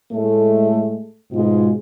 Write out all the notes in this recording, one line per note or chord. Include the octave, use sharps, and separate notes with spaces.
A2 G#3 A3
G#2 B2 G#3 F4